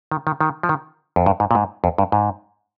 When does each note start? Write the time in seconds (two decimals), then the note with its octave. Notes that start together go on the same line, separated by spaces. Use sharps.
0.11 D#3
0.27 D#3
0.41 D#3
0.63 F3
0.69 D#3
1.16 F2
1.26 G2
1.40 G#2
1.51 A#2
1.55 G#2
1.84 F2
1.98 G2
2.12 G#2